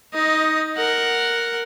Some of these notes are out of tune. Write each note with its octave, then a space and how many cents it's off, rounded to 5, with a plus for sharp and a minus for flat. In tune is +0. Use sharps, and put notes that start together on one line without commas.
D#4 +20 D#5 +0
A#4 +0 F#5 +0